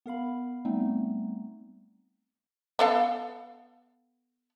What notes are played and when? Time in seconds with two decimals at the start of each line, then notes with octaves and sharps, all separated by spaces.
0.06 B3 A#4 F5 B5
0.65 G3 A3 B3 C4 D#4
2.79 B3 A4 F5